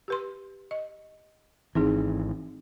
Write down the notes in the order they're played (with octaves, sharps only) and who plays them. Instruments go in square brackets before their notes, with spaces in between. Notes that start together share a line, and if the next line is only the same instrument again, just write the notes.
[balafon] G4 B4 C6
D#5
[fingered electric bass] G#1 E3 [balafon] C4 D#4 G#4